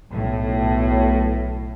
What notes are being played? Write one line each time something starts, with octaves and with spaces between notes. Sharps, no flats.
B1 A2